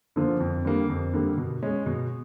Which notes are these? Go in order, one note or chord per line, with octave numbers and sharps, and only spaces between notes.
D3 F3 A#3
F2
D3 G3 A#3
F2
D3 G3 A#3
B2
G#3 C#4
B2